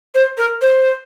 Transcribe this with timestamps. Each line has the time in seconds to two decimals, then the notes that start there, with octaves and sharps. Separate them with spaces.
0.15 C5
0.38 A#4
0.62 C5